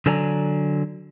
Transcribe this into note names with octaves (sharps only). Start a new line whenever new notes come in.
D3 F#3 A4 D5 G#5 A#5